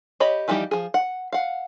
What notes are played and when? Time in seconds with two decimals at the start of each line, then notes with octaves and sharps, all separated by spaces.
0.20 G4 C#5 D#5 B5
0.48 E3 F3 G3 D#4 G4
0.71 F3 G#4
0.94 F#5
1.33 F5 F#5